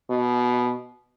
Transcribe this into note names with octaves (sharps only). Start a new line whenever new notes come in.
B2